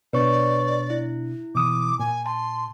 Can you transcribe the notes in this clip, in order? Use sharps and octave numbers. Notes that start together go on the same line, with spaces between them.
B2 D4 B4 C#5 D5 C#6
E4
B2 E3 D6 D#6
A#2 G#5
A5 C6